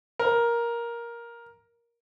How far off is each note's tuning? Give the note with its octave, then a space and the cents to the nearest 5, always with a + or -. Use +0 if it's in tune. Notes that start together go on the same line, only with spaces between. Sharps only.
A#4 +10